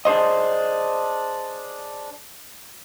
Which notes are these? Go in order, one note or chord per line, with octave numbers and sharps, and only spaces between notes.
D4 G#4 C5 D#5